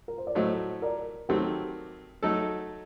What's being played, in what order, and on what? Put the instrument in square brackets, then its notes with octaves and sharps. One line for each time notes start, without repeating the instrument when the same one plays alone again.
[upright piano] A#4
C5
D5
[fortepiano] A2 F#3 A3 [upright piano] C5 D#5
[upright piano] A#4 D5
[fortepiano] D#3 F#3 A3 C4 [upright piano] G4 A#4
[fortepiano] F#3 A3 D#4 A4